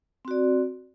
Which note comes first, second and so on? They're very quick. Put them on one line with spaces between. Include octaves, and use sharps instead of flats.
C4 F#4 D5